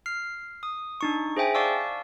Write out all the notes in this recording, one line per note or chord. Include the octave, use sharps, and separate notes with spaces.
F6 C7
D#6
D4 D#4 C#6
G#4 C5 E5 G5 G#5
D5 F5 A5 C#6 D6 E6